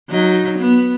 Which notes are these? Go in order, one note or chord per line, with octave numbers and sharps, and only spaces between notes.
F#3 D#4
B3